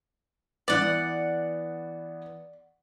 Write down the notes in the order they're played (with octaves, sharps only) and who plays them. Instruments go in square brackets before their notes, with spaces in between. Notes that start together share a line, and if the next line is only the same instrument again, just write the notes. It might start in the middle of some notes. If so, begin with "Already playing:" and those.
[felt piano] E3 B3 [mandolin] D5 F#5